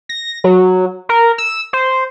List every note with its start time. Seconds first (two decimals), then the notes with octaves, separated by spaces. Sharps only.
0.09 A#6
0.44 F#3
1.09 A#4
1.38 E6
1.73 C5